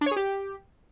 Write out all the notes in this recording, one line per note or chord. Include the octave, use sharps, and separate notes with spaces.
D4
C#5
G#4
G4